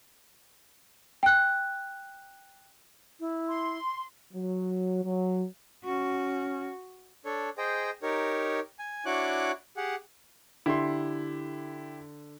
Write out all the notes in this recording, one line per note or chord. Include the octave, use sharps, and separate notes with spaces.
G5 F#6
E4
C6
F#3
F#3
C#4 F#4
D4 A4 C#5
G#4 C5 D#5 G5
D#4 G4 A#4 C#5
G#5
D4 E4 F#4 C#5 D6 F#6
G4 G#4 F#5
D3 E4 G4 C6